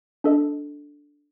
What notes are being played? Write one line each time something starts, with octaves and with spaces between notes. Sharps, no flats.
D4 A4 D#5